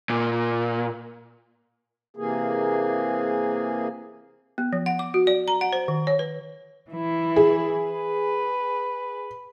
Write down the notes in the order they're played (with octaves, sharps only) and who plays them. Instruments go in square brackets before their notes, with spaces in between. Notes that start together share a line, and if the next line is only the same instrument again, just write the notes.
[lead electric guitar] A#2
[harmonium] C3 E3 A#3 G#4
[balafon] B3
F3
F#5
D6
F#4
D5
A#5
F#5
C5
D#3
C#5
B4
[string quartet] E3 E4
[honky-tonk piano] G#4
[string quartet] B4